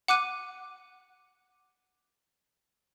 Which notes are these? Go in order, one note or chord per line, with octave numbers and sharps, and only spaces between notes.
F#5 D6 F#6 D#7